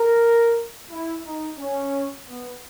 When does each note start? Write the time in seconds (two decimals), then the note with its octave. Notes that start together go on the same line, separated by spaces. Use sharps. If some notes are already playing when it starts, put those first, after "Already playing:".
Already playing: A#4
0.90 E4
1.25 D#4
1.58 C#4
2.26 B3